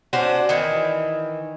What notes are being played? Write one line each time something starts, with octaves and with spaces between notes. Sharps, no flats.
C#4 D4 F#4 C5
D#3 E3